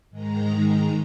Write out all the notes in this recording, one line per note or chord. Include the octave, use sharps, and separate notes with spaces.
G#2 D#3 G#3 A#5